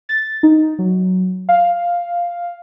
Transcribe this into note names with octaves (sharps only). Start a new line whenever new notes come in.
A6
D#4
F#3
F5